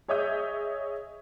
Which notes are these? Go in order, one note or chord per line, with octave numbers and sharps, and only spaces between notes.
G#4 C#5 D#5 E5 D#6 G6